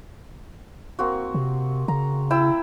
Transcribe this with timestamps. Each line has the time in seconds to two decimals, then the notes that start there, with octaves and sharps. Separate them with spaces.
0.99 A#3 C4 F#4
1.34 C3
1.88 C#3 A#5
2.30 E4 G5 E6